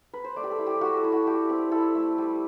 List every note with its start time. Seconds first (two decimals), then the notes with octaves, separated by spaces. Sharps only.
0.14 B4
0.24 C5
0.36 A3 D5
0.44 G4
0.51 A4
0.59 E4
0.67 G4
0.81 A3 F#4
0.97 A4
1.04 E4
1.12 F#4
1.27 A3 G4
1.49 C4
1.72 E4 A4
1.95 A3
2.18 G3